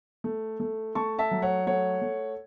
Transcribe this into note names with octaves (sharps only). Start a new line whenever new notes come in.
A3
A3
A3 A5 C#6
E5 A5
F#3
C#5 F#5
A3 C#5 F#5
A3